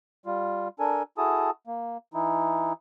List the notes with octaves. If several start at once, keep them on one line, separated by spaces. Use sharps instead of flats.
G3 F4
D4 A4 A#4 G#5
E4 F#4 G#4 A4 A5 D#6
A#3
E3 D#4 E4